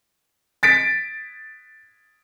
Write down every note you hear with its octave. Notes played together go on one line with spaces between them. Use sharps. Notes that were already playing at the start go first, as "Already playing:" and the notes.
A6 B6 D7